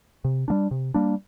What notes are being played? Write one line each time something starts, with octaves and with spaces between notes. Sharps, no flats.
C3
G3 A#3 D4
C3
G3 A#3 D4